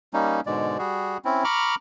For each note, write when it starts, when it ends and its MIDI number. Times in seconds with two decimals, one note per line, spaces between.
0.14 0.40 55
0.14 0.40 58
0.14 0.40 61
0.14 0.40 63
0.46 0.78 44
0.46 0.78 47
0.46 0.78 50
0.46 0.78 56
0.46 0.78 74
0.78 1.17 55
0.78 1.17 66
0.78 1.17 68
1.25 1.44 60
1.25 1.44 61
1.25 1.44 64
1.44 1.75 82
1.44 1.75 83
1.44 1.75 85
1.44 1.75 86
1.44 1.75 89